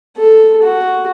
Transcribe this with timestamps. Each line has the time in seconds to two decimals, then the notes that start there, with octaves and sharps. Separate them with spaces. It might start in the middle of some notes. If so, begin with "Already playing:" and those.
0.18 A4
0.63 F#4